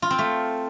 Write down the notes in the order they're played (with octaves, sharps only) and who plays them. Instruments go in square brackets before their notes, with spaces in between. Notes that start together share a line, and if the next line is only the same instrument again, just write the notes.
[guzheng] F4
C4
A3